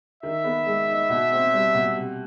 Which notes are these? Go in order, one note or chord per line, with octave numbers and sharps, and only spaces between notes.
D#3 E5
B3
G#3
D#4
B2
C4
G3
B2
C3